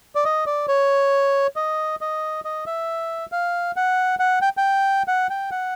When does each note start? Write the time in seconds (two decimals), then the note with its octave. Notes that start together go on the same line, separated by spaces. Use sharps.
0.15 D5
0.25 D#5
0.46 D5
0.68 C#5
1.56 D#5
2.01 D#5
2.45 D#5
2.67 E5
3.32 F5
3.76 F#5
4.19 F#5
4.42 G5
4.57 G5
5.08 F#5
5.30 G5
5.51 F#5